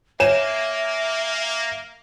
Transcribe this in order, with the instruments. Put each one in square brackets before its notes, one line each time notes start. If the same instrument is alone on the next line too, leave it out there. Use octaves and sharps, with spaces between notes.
[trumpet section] A#3 [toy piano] C#5 [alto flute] E5 [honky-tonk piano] G#5 E7